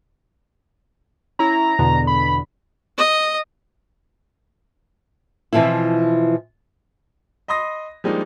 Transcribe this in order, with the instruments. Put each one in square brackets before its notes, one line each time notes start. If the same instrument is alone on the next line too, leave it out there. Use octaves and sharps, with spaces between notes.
[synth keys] C#4 E4 [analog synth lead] A#5
[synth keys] E2 B2 D3
[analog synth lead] B5
[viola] D#5
[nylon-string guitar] B2 E3 F3 C4 E4
[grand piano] D#5 B5 C6 D#6 A#6
F3 G3 G#3 A#3 D4 D#4